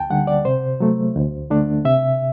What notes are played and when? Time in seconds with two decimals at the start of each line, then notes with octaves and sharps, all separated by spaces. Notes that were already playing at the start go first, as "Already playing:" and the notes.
Already playing: D2 G5 A5
0.10 D3 G3 F#5
0.27 D5
0.45 C3 C5
0.80 F#3 A3
1.16 D2
1.50 D3 A3 D4
1.85 C3 E5